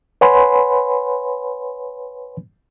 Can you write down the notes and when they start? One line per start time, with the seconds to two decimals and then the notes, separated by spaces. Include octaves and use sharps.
0.21 B4 C#5 F#5 G#5 B5 C6